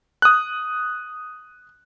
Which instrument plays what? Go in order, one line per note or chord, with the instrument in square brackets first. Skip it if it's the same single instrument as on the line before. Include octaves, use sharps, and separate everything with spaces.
[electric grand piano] D#6 F#6